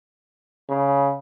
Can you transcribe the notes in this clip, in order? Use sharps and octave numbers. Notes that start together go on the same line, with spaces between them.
C#3